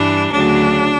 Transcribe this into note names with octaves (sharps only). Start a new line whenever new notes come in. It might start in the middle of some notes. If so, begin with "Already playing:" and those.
Already playing: G2 E3 G3 D4
D2 C#3 F#3 D4